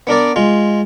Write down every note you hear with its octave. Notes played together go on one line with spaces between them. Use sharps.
B3 D4 A#4 D5
G#3 F4